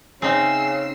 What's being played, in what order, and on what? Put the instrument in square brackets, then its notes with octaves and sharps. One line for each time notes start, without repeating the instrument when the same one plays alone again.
[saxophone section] C#3 [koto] C4 D#4 [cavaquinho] G#4 E5 [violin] E6 C7